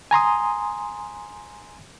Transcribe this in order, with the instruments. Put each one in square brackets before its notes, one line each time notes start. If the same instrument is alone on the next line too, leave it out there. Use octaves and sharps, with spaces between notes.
[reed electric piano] G#5 A#5 C6 D#6